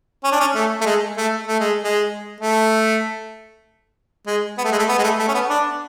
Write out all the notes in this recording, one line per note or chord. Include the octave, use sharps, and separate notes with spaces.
C#4
D4
C#4
A3
A3
G#3
A3
A3
G#3
G#3
A3
G#3
B3
A3
G#3
A3
B3
G#3
A3
A3
C#4
B3
D4